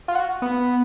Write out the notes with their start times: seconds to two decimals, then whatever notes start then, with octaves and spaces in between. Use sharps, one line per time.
0.08 F4
0.15 F#4
0.42 B3